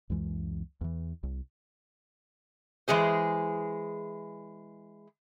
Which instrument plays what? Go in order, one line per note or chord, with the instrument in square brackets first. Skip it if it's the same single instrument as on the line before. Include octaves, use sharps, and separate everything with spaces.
[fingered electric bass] C#2 F#2 E3 G#3
E2 E3
C2
[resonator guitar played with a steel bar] E3 G#3 G#4 C5